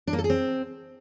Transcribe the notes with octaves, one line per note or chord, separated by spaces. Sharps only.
D4
A#3
A4
G#4
C4